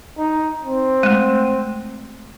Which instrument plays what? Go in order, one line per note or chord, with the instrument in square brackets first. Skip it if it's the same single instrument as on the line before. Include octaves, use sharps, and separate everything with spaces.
[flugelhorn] D#4
C4
[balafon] G#3 A3